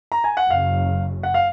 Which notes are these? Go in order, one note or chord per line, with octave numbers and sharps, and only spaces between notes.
A#5
G#5
F#5
F#1 F#2 C#3 F5
F#5
F5